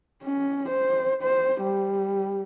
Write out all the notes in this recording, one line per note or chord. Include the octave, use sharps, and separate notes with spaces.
C#4
C5
C5
G3